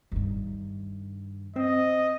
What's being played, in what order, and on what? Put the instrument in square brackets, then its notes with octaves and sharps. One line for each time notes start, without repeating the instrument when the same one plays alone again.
[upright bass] G2 D#3
[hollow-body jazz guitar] C4 [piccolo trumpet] D#5